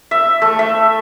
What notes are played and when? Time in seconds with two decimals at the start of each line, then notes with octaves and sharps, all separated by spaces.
0.11 E5
0.42 A3
0.59 E5